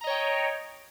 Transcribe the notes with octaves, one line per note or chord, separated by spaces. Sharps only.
C#5 D#5 G5 A#5